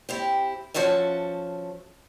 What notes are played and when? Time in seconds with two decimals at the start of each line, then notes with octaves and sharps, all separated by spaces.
0.09 C4 E4 G4
0.74 F3 C#4 F#4 A4 E5